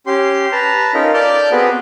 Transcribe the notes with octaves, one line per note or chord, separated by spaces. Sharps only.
C#4 G4 C6
B4 A5 A#5
C#4 D#4 F4 A4 A#4
A4 D5 A5 D6 F6 G6
B3 C4 F#4 G#4 B4